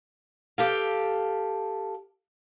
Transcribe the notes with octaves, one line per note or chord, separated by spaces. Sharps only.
G4 A4 F5